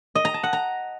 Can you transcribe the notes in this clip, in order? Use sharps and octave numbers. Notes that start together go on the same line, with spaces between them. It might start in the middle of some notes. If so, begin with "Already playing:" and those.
D#5
A#5
A5
F#5
A#5